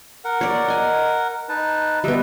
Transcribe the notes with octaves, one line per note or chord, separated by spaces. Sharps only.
A#4 F#5
C#5 D5
D#5 G#5
D#4 B4 A5
G3 B3 D#5 E5